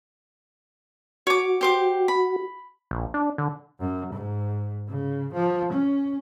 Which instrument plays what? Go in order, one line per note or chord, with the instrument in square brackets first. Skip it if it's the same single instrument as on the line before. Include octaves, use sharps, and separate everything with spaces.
[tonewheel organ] F#4 [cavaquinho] C#5 D6
[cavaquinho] G4 C5 D6
B5
[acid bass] A#1
D4
D3
[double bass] F#2
G#2
C#3
F3
C#4